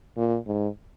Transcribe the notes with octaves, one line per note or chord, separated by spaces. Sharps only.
A#2
G#2